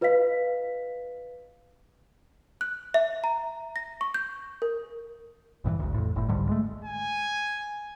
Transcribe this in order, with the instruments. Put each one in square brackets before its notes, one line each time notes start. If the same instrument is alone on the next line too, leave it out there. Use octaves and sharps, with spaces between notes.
[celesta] F4 B4 D#5 F5 B6
[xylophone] F#6
E5
A#5
A#6
C#6
G6
A#4
[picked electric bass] A#1 G2 D#3 E3
G#1 D2
F2 A2
G1 A2
C2 G#2 D3 G3
G#3 A3
[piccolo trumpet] G#5